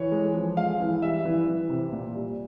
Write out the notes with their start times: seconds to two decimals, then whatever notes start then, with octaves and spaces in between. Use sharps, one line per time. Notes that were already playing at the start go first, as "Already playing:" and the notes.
Already playing: E3 C#5
0.12 G#3
0.34 F3
0.57 G#3 F5
0.80 E3
1.02 G3 E5
1.25 E3
1.47 E3
1.69 C3
1.92 A#2
2.15 G3